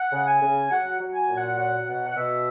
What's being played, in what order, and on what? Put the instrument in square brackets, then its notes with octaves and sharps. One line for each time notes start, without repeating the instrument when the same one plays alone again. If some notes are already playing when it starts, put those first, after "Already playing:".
Already playing: [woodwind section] F#5
C#3
G#5
C#3
F#3 F#5
F#3
G#5
A#2
F#5
F#3 F#5
B2 F#5
F#5
B2 E5